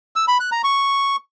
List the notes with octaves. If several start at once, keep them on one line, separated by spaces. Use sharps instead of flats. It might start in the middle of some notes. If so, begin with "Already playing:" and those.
E6
B5
F#6
A#5
C#6